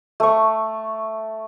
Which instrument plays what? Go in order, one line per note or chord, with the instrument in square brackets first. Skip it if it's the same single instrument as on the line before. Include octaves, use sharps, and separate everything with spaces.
[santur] A3 C#6